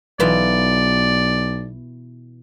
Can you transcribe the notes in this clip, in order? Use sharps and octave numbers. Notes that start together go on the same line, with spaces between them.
B1 B2 E3 F4 D5